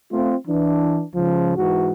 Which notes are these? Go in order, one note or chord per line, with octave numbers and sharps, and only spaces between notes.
A3 C4 F4
E3 D4
C#2 C#3 F3
G#2 E3 F#4